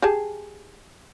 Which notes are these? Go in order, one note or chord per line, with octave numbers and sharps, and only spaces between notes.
G4 G#4 A5